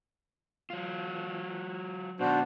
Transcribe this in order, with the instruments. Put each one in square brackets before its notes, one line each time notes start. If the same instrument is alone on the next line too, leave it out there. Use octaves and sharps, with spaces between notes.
[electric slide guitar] F#3 F4
[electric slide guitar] B2 D#3 [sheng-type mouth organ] D4 F#4 C5